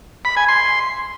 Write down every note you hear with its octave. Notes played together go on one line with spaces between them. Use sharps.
B5
G#5
C6